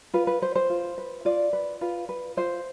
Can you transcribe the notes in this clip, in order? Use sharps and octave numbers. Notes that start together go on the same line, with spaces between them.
F4 B4
B4
B4 C5
C5
F4
B4
F4 D5
B4
F4 B4
B4
F4 C5